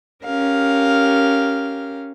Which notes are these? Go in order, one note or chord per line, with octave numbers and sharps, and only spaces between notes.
C#4 G4 A#4 F5